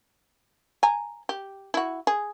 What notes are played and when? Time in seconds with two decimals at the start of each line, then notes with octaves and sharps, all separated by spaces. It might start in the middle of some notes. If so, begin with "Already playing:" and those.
0.83 G#5 A#5
1.29 G4
1.74 E4 F#4
2.07 G#4